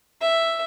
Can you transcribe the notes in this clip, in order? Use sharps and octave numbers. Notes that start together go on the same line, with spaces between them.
E5